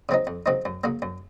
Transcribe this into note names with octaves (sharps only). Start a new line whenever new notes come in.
C#3 F#3 C4 D#4
F2
C#3 F#3 C4 D#4
F#2
C#3 F#3 A#3
F#2